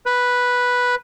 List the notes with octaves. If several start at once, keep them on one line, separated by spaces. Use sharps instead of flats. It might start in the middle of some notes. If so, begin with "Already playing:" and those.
B4